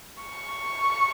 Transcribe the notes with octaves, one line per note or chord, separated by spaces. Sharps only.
C#6